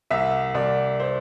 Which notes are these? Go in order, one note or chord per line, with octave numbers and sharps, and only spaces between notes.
C2 E5
C2 D5
C5